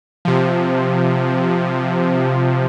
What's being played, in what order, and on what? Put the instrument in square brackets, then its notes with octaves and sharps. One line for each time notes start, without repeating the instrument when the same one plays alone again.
[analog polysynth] C3 F3